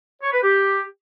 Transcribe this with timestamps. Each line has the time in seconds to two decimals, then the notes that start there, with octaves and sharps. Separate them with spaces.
0.22 C#5
0.32 B4
0.42 G4